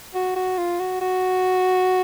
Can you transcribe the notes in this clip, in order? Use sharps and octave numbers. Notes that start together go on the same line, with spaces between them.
F#4
F#4
F4
F#4
F#4